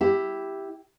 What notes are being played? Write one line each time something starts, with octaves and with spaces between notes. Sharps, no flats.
E4 G4